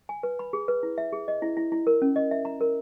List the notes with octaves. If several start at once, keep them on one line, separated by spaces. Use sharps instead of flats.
G#5
B4
B5
G#4
B4
E4
E5
G#4
D#5
E4
E4
E4
A#4
C#4
D#5
E5
A#5
A#4